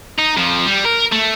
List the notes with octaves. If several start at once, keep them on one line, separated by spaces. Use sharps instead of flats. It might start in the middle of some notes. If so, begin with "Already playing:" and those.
D#4
F2 F3
G3
A#4
A3